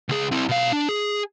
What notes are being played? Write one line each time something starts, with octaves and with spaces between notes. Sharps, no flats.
C#2 G#4
C4 E4
B2 F5
D4
G#4